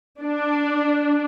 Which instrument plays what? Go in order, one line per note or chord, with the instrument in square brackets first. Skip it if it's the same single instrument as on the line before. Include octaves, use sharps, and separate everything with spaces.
[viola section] D4